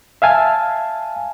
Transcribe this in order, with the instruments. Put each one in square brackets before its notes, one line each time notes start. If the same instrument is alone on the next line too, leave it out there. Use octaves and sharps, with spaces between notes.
[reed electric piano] E5 F5 G#5 A5